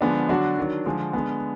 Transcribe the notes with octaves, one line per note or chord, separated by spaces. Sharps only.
D3 F3 G#3 B3 D4
D3 F#3 D4 F#4
D#3 F#3 D4
D3 F3 G#3
D3 G#3 B3